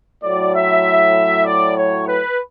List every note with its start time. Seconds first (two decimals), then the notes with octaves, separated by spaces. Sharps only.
0.23 A2 F#3 D5
0.53 E5
1.45 D5
1.75 C#5
2.06 B4